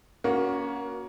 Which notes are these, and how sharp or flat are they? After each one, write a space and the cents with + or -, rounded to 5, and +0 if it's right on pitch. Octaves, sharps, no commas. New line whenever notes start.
A#3 +15 C#4 +20 F#4 -5